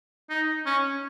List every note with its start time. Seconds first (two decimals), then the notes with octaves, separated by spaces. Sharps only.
0.30 D#4
0.66 C#4